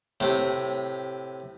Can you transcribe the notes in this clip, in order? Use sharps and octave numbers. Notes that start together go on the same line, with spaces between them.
A2 C3